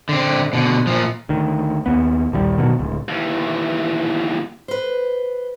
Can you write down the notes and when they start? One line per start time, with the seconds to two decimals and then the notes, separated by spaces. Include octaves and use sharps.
0.09 D3 C4
0.53 B2 D3
0.87 A#2 F3
1.29 D2 D#3
1.86 D#2 B3
2.32 A#1 D#2 D#3 G3
2.58 G1 B2 D#3 F#3
2.78 D1 C#2
3.08 D#2 E3
4.68 B4 C5